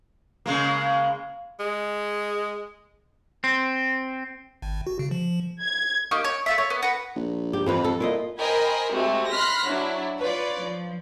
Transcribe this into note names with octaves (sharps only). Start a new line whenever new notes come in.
C#3 G#3 A#3
G#3
C4
G#1
F#4
C#3
F3
G#6
A#3 D#4 G4 C#6
C#5
A3 F4 E5
C#5
B3
F#4 B4
A#1
G4
F2 E3 F3 B4
A4
A#2 E4 F4 D#5
A#4 C5 D#5 G5 G#5 B5
G#3 A3 C4 F#4 G4
B5 C6 F6 F#6 A#6 B6
F#3 D4 E4
F4 B4 C#5 D5
F3